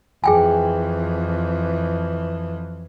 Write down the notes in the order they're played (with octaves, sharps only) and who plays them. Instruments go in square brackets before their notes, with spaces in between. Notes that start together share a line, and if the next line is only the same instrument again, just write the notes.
[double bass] F2 E3 [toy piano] G#4 G5 G#5